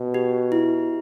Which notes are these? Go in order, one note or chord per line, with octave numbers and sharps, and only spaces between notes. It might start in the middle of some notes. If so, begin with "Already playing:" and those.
Already playing: B2
G4
E4